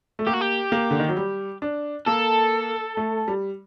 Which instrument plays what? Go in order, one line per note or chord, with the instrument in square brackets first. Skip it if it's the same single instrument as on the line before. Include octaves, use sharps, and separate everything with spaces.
[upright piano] A3
[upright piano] A#3 [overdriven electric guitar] G4
[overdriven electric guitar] F#4
G4
[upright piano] A#3
D3
D#3
F#3
G3
D4
[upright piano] A#3 [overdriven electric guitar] A4
[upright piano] A3
G3